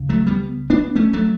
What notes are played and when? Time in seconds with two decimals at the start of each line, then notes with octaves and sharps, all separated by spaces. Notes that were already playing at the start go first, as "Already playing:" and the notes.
Already playing: C#2 C#3
0.09 F#3 A3
0.27 G3 B3
0.70 B3 D4
0.96 A3 C#4
1.13 F#3 A3